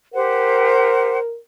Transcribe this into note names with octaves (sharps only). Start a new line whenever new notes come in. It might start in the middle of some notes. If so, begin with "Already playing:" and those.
G4 A#4 C5 F#5